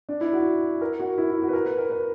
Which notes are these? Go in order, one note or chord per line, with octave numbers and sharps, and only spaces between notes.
D4
E4
F#4
A#4
F#4
E4
E4
F#4
B4
A#4
B4
A#4
B4